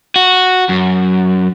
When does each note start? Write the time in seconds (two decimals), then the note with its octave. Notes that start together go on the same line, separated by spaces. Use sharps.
0.16 F#4
0.69 F#2